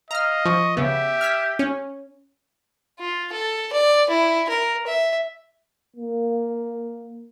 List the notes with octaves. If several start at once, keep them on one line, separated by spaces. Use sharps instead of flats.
D#5 F5 A#5 F6
F3 C#6
C#3 B3 G4 E5
F6 G#6 B6
C#4
F4
A4
D5
E4
A#4
E5
A#3